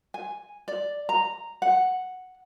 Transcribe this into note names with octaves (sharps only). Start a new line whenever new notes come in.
G#5
D5
A#5
F#5